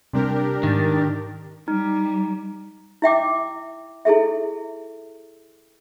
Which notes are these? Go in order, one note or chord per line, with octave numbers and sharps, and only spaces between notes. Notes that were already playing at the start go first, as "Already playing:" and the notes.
C3 G3 C4 D4 G4 A#4
G#2 D#3 A6
G3 D#4
E4 E5 G5 D6
E4 G#4 A4 E5